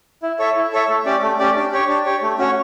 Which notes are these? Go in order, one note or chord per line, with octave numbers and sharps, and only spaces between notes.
E4
A4 C#5 E5
E4
A4 C#5 E5
A3
C#4 G4 D5
A3
C#4 G4 D5
D4
G4 C#5
D4
G4 C#5
A3
C#4 F#4 C#5